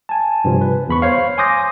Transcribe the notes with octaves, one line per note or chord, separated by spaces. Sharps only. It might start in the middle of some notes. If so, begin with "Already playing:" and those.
G#5 A5
G2 C3 F3
B4
E2 B5 C#6
C5 C#5 F5
G#5 C6 D6 D#6 G6 A#6